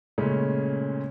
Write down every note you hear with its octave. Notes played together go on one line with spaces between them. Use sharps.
A#2 C#3 G#3 A3 C#4